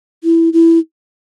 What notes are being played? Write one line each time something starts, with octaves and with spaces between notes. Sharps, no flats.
E4
E4